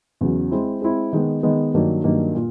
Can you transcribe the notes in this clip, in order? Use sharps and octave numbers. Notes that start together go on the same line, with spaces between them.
E2 C#3 F#3
G#3 C4 E4
G#3 C4 E4
D#3 G#3 B3
D#3 G#3 B3
G2 D#3 F#3 A#3 D4
G2 D#3 F#3 A#3 D4
A#2